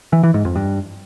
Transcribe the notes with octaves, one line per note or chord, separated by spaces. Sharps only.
E3
E3
G#2
F2
G2